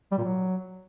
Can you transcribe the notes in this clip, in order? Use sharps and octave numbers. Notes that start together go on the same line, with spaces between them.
G3
A#2
F#3